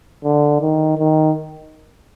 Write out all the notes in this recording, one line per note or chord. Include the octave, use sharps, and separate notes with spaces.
D3
D#3
D#3